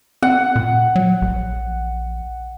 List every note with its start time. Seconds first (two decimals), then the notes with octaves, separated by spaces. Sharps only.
0.22 C4 F#5
0.56 A#2
0.96 F#3
1.22 A#1